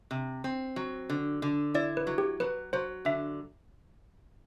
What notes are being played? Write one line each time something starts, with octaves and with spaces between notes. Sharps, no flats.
C3
C4
F#3
D3
D3
E4 D5
B4
F#3
G4
F#3 B4
F#3 C5
D3 E5